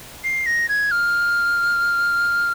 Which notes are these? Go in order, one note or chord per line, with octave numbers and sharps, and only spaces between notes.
C7
A#6
G#6
F6